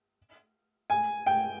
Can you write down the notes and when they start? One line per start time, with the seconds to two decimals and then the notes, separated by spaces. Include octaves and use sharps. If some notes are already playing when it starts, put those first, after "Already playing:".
0.90 G#5
1.26 G5